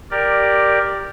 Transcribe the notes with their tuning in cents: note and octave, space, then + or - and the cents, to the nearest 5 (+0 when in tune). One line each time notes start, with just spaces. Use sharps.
G4 +0 A#4 +0 D5 +10